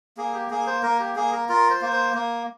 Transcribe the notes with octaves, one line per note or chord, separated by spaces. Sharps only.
A#3 G#4
G4
A#3 G#4
C5
A#3 A#4
G4
A#3 G#4
A#4
F4 A#4
C5
A#3
C5
A#3